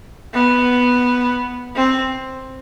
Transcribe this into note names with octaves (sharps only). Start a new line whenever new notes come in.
B3
C4